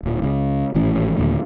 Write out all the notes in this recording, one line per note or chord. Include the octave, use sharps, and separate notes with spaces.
D1 A#2
C#2 C#3
G#1 A2 E3 C#4
D#2 A#2 D3 A3